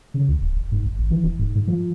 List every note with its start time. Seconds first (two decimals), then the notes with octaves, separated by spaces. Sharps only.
0.14 C#3
0.28 D2
0.41 D1
0.56 F1
0.72 G#2
0.85 G1
0.99 G#1
1.10 E3
1.23 D#1
1.39 G#2
1.55 G#2
1.67 F3